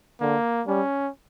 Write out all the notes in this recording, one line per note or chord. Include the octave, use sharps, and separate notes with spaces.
D3 A#3
G3 C#4